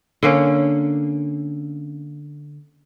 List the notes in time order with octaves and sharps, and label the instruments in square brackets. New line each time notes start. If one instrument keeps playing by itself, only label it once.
[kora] D3 A#3 C#4